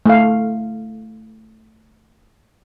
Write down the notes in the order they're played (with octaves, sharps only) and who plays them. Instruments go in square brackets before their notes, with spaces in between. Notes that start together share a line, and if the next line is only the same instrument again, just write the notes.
[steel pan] A3 F5